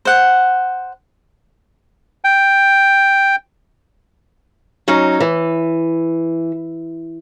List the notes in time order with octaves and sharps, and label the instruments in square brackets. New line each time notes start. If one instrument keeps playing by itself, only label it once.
[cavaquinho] C5 F#5
[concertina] G5
[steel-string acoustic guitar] F#3 C#4 D#4
E3